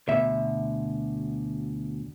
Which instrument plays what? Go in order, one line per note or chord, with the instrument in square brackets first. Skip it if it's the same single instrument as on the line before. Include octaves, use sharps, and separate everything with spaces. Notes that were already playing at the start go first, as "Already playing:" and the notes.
[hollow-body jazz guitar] D2 B2 E5